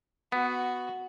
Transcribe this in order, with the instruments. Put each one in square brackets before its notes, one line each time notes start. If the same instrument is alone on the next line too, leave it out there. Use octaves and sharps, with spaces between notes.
[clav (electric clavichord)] B3 [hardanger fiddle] F#4